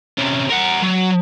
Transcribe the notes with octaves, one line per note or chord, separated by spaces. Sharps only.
C3 C#4
A#4 F#5
F#3